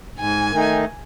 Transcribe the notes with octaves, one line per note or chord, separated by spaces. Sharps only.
G#2 G#5
D#3 A3 D#4